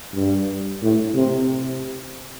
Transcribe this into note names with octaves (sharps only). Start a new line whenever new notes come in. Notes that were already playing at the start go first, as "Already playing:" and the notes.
G2
A2
C3